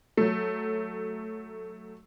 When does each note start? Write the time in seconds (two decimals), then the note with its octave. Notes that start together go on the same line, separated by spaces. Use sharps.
0.17 F#3 A3